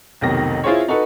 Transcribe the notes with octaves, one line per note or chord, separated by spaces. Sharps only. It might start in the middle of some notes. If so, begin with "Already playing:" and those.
F1 B1 D#3 G4 A#6
E4 F4 G#4 C5 C#5
D#4 F#4 A4 B4